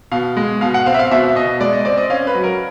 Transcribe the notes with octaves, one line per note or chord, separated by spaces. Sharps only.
B2 F5
G#3
B2 F5
F#5
C4 F5
E5
F5
B2 E5
B2 D#5
G#3 D5
D#5
C4 D5
D#5
C#4 F5
B4
F#3
A#4